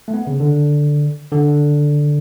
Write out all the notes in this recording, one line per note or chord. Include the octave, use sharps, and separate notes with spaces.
A3
B3
C#3
D3
D3